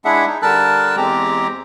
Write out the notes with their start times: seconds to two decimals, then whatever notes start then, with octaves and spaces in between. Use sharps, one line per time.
0.05 G#3 D4 E4 G#4 E5 F#5
0.27 D#4
0.42 D3 G3 A#4 A5 E6 F#6
0.97 E2 G#3 C4 G4 A#5